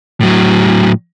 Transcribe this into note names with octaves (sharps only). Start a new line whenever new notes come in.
A2 F#3